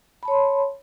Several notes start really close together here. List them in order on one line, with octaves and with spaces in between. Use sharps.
B5 A5 C#5 C6